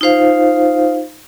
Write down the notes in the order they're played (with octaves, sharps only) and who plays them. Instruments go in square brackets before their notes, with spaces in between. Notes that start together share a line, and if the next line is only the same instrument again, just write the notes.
[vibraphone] D#4 F4 C5 F5